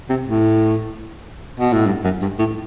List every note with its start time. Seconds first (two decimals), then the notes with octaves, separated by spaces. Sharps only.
0.10 C3
0.28 A2
1.60 B2
1.73 A2
1.86 G2
2.04 F#2
2.22 G2
2.39 A2